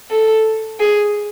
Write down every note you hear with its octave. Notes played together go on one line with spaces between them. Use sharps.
A4
G#4